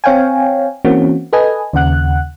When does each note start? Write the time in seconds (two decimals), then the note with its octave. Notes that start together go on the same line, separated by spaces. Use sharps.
0.04 C4 C#5 F5 G5 G#5
0.85 E3 A#3 C4 C#4 F#4
1.33 A4 B4 D#5 G#5
1.73 D#2 C#3 F#5 F#6